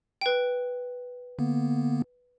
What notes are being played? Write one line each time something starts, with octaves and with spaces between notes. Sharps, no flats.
B4 G5
D3 A#3 B3